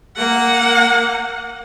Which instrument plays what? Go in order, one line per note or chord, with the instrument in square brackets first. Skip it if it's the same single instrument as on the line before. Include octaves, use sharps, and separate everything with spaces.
[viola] A#3 F#5